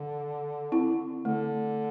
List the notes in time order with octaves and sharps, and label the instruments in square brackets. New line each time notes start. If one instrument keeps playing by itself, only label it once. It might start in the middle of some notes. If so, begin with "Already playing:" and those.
Already playing: [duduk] D3
[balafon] C4 E4
[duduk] D3 [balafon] A3